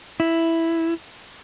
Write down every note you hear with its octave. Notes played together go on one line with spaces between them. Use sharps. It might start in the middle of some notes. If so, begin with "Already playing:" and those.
E4